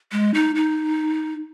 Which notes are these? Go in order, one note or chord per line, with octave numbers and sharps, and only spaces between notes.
G#3
D#4
D#4